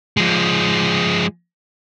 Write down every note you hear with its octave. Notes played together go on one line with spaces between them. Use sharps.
F3 G#3